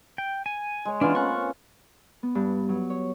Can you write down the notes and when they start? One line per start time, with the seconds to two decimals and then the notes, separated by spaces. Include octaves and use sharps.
0.18 G5
0.46 G#5
0.85 G#3 C#5
1.01 E3 B3 C#4 D4 F4
1.15 A#3 C4 C#4 C#6 F#6
2.23 B3
2.35 G2
2.69 F#3
2.90 C#5